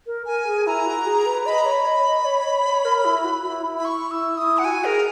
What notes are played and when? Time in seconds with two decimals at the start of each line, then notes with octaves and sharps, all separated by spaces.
0.07 A#4
0.26 A#4 G#5
0.47 G#4
0.67 E4 A#5
0.86 F#4
1.06 G#4
1.26 B4
1.46 D#5 B5
1.58 A#5
1.66 C#5
1.71 B5
1.86 D#5
2.06 D#5
2.25 C#5
2.45 C#5
2.65 C#5
2.85 A#4
3.05 E4
3.25 F#4
3.45 E4
3.65 E4
3.79 B5
3.85 C#6
4.11 E4 E6
4.37 E4 D#6
4.58 F#5
4.64 F#4 G#5
4.75 F#4
4.84 G#4 A#4